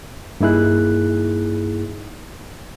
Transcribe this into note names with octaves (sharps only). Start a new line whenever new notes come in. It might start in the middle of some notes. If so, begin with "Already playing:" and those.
G2 A#3 D#4 E4 G#4 F#6